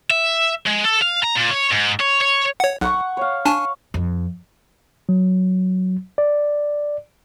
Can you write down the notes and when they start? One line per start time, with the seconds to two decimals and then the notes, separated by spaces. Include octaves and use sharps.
0.10 E5
0.67 G#3
0.85 A4
1.02 F5
1.24 A#5
1.36 A#2
1.51 C#5
1.72 G#2
2.00 C#5
2.21 C#5
2.60 C#5 F#5
2.81 B1 F#5 C#6
3.17 C#5 F5
3.46 D4 G#5 A5 C#6
3.94 F2
5.09 F#3
6.18 D5